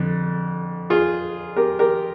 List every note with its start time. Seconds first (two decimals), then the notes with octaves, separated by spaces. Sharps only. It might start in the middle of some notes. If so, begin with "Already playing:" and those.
Already playing: F2 D3
0.90 F4 G#4
1.56 G4 A#4
1.79 G4 A#4